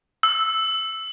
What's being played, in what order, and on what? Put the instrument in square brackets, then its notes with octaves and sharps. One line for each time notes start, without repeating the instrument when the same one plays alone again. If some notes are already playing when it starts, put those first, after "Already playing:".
[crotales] E6